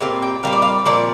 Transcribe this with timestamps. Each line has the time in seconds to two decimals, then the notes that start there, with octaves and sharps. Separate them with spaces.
0.01 A#2 G3 C4 F5
0.22 G5
0.43 A#2 G3 C4 F5
0.53 D5
0.62 F5
0.85 A#2 F3 C4 D5